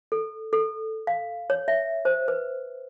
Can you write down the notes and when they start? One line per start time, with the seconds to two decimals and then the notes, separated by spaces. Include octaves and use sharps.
0.12 A4
0.53 A4
1.07 F5
1.50 C#5
1.68 E5
2.05 C5
2.28 B4